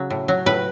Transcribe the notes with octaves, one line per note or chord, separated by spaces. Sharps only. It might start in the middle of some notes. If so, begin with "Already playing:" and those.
Already playing: C#3 F#3
A2
F#3
A2 B4